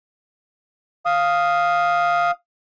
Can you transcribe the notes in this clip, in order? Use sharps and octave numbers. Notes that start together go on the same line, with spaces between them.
F5 D#6